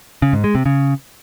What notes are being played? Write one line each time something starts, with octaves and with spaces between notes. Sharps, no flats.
C#3
G#2
G#3
C3
C#3